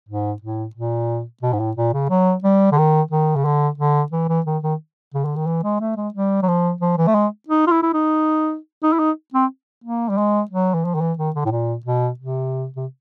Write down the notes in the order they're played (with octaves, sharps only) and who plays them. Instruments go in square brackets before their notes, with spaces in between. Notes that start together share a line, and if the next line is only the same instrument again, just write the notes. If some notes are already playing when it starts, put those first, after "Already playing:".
[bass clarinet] G#2
A2
A#2
B2
G#2
A2
A#2
C#3
F#3
G3
D3
D#3
D#3
C#3
D3
D3
E3
E3
D#3
D#3
C#3
D3
D#3
E3
G#3
A3
G#3
G3
F#3
F3
F3
E3
A3
G#3
D#4
F4
E4
E4
D#4
D#4
E4
D#4
C4
A#3
G3
G#3
F#3
E3
F3
D#3
E3
D#3
D3
A2
A#2
B2
C3
C3